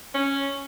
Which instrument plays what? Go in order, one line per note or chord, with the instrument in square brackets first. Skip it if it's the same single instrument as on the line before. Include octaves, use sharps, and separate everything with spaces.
[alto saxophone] C#4